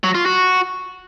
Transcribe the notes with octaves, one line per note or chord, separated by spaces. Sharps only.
F#3
F4
F#4